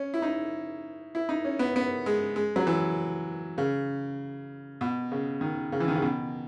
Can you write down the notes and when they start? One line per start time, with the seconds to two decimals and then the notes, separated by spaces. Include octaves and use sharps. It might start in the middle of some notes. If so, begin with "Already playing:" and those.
Already playing: C#4
0.14 E4
0.22 D#4
1.15 E4
1.29 D#4
1.45 C#4
1.59 B3
1.76 B3
2.06 G#3
2.36 G#3
2.56 F#3
2.67 E3
3.58 C#3
4.81 B2
5.12 C#3
5.41 D#3
5.72 C#3
5.80 E3
5.88 D#3
5.95 C#3
6.02 B2